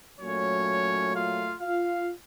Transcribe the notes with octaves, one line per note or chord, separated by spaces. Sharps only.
A#2 F#3 A3 C#4 C#5
F4 F5
F4 F5